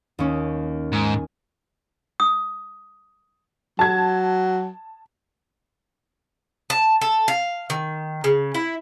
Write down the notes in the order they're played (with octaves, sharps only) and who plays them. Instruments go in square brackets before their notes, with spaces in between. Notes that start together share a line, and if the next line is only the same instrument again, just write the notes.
[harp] D#2 C#4
[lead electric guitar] G#2 [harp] G#5
[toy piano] D#6
[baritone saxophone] F#3 [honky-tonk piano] A5 G#6
[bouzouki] A5
A4
F5
D#3
C#3
E4